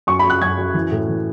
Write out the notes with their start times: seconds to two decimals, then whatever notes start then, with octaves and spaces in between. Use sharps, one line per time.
0.07 F#2 C#6
0.19 B5
0.24 F#2
0.30 F#6
0.42 F#2 G#6
0.57 F#2
0.74 E3
0.92 A2
1.09 E3